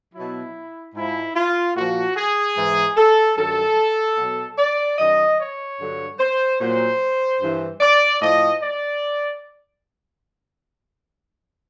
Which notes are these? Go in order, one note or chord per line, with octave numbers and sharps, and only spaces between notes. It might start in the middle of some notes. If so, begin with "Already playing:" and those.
B2 F#3 E4
G#2 F3 E4
F4
A#2 F3 F#4
G#4
G#2 E3
A4
G2 D#3 F#3 A4
B2 F#3
D5
F#2 D#3 F#3 D#5
C#5
G2 D3 F#3
C5
A#2 F#3 C5
G2 E3
D5
A2 F3 D#5
D5